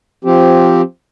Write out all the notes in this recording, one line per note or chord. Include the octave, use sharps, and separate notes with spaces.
F3 C4 G4